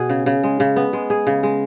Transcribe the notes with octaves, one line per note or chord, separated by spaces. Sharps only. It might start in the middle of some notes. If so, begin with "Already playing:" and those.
Already playing: B2 G#4
C#3
C#3
G#3
C#3
B3
G#3
G#4
C#3
G#3